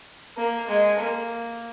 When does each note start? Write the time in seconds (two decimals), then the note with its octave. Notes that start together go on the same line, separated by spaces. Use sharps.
0.37 A#3
0.69 G#3
0.99 A#3